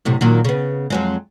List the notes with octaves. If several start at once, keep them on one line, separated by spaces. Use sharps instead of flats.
F#2 A2 C3
A#2 D#3 F#3
C#3 B3
F2 F#3 G#3